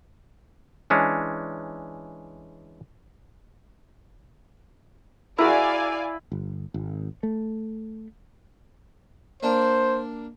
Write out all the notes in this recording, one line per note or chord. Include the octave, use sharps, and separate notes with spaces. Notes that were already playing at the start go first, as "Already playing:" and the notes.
E3 G#3 C#4 D4
E4 F#4 G#4 A#4 D5 F5 G#5
G1
G#1
A3
A#3 D4 C5